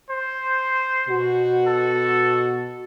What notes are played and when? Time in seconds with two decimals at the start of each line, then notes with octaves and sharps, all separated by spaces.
0.10 C5
1.09 B2 F#4
1.67 A4